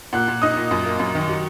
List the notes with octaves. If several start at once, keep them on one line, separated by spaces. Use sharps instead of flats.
A#2 F#5 F#6
A#2
D#4 D#5 D#6
A#2
F#2
A#3
F#2
D#3
F#3